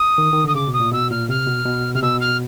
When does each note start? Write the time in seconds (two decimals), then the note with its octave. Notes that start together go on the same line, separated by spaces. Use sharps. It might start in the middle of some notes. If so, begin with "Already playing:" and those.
Already playing: D#6
0.18 D#3
0.33 D#3
0.44 D3 D#6
0.55 C#3 D6
0.67 B2
0.73 D#6
0.80 A#2
0.92 B2 E6
1.10 A#2 F6
1.29 C3 F6
1.47 B2
1.65 B2
1.94 C3 F6
2.02 B2 E6
2.20 F6